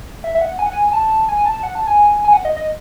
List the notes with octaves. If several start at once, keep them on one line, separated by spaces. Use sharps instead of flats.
E5
E5
F#5
G#5
F#5
G#5
G#5
A5
G#5
A5
F#5
A5
G#5
G#5
F#5
D#5
D#5